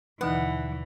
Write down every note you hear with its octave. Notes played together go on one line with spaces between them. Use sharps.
D#2 B2 D3 E3 D#4 B4 F#5